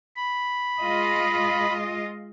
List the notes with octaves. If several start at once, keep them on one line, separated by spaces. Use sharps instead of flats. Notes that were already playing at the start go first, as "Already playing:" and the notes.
B5
G#3 F4 D#5